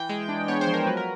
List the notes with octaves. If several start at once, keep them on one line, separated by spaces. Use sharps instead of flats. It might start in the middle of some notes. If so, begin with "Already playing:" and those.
Already playing: E3 G5
G#3
D4
B3 C#5
C5
F3
A#4
F#3 B4
A#4